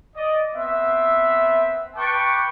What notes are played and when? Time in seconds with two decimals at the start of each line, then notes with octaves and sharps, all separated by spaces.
0.17 D5 D#5
0.55 B3 C4 E5
1.96 B4 G5 A5 C#6 D6